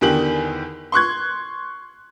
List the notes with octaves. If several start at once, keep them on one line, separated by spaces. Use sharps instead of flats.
E2 D3 D#3 G4 F#7
C6 C#6 F#6 G#6